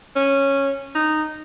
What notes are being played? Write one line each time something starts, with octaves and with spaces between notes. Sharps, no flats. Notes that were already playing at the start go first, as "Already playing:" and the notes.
C#4
D#4